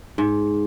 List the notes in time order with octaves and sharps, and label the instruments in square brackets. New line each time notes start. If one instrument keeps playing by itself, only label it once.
[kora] G#2